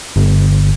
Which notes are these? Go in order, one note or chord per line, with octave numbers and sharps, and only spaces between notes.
G1